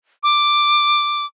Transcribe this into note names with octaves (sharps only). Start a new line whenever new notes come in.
D6